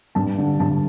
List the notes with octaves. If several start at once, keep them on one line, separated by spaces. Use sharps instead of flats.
G2 A5
D3
G2 A5